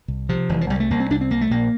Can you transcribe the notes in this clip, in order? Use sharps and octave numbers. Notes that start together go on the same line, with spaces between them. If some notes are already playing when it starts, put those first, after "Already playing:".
C2
C3 F3
F1 E3
F3
C2 G3
A3
C2 A#3
C4
C2 D4
C4
C2 A#3
A3
A#1 A#3